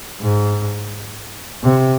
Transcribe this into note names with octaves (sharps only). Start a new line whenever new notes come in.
G#2
C3